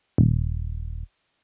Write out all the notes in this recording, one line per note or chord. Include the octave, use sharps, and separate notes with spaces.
D#1